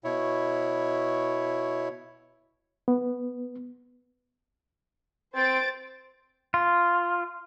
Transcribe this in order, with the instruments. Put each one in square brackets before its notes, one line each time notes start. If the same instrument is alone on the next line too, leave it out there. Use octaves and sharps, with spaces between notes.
[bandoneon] B2 E4 C#5
[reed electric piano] B3
[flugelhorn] C4 [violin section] C5 A6 D7
[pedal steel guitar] F4